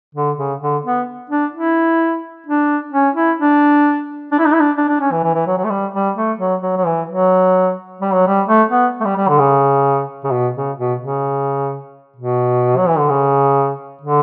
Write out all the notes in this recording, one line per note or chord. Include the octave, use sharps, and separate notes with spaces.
D3
C#3
D3
B3
D4
E4
D4
C#4
E4
D4
D4
E4
D4
E4
D4
D4
D4
C#4
E3
E3
E3
F#3
F#3
A3
G3
G3
A3
F#3
F#3
F#3
E3
F#3
G3
F#3
G3
A3
B3
A3
G3
G3
D3
C#3
C#3
B2
C#3
B2
C#3
B2
F#3
E3
D3
C#3
D3